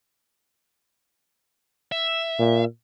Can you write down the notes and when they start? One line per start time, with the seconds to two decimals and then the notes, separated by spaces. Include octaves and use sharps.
1.92 E5
2.39 A#2